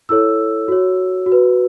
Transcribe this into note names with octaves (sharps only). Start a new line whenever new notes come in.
E4 A4 C#5 E6
F#4 C#5
F#4
B4